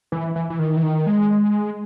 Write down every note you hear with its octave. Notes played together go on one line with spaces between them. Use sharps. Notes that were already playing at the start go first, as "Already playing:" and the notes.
E3
E3
E3
D#3
E3
D#3
G#3